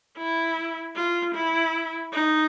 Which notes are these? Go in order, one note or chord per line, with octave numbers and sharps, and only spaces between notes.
E4
F4
E4
D#4